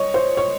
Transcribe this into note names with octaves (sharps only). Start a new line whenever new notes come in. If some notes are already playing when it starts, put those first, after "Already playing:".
Already playing: C#5 D#5
C5
C#5